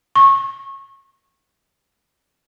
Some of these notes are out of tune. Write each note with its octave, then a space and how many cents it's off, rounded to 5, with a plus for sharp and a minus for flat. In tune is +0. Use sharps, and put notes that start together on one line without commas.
C#6 -25